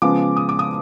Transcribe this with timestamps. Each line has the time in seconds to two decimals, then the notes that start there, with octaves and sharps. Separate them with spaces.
0.02 C#3 F3 G#3 B3 D6
0.37 D#6
0.49 D6
0.59 D#6